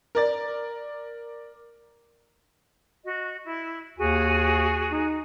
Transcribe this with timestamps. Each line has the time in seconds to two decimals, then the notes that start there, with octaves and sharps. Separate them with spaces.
0.15 A#4 D5 A6
3.05 F#4 D#5
3.45 E4
3.98 D#2 F#4 G#4 G#5
4.92 D#4